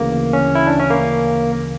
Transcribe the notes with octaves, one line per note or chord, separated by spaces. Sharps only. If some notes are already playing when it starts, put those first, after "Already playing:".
Already playing: D2 C#3 E3 A#3
C#4
E4
D4
C#4
A#3